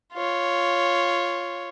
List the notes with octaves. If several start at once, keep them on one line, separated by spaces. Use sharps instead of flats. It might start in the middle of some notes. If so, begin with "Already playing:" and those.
F4 C#5